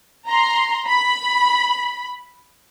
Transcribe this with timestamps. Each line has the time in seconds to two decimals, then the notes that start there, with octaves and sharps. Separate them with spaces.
0.28 A#5 C6
0.86 B5